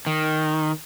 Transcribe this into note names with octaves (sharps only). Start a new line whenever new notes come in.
D#3